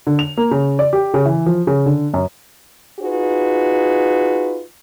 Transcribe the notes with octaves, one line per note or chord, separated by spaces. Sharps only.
D3
F7
A#3
C#3
D5
G4
C#3
E3
F3
C#3
D3
F#2
D#4 F4 F#4 G#4 B4